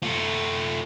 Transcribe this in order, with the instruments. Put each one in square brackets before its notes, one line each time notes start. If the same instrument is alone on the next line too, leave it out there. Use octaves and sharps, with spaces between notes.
[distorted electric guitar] A3 F4